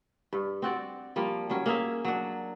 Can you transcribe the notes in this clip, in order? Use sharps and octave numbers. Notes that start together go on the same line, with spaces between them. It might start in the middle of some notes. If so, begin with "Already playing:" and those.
G2
C4 F#4 D5
F3 G3 A#3
F#3 G3 C#4
A#3 G#4 E5
F#3 D4